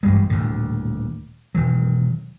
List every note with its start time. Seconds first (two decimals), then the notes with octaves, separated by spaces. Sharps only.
0.03 A1 G2 G3 G#3
0.30 D#1 D2 A2 D3
1.55 E1 D#3 F#3